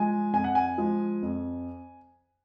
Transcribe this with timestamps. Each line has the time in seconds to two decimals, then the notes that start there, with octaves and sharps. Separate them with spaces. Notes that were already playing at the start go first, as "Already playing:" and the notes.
Already playing: F3 G#3 G#5
0.33 F2 G#5
0.44 F#5
0.55 G#5
0.78 F3 G#3
1.22 F2